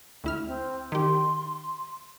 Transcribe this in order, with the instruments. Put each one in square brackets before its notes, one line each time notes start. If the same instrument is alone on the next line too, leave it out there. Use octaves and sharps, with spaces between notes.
[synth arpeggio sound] D2 E4 F6
[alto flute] C4
[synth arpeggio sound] D#3 G4 [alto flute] C6